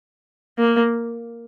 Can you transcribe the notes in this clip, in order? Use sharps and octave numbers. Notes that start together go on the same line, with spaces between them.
A#3